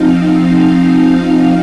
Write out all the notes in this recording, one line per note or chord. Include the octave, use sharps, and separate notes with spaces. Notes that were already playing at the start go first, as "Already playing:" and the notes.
Already playing: F3 C4 D#4 F5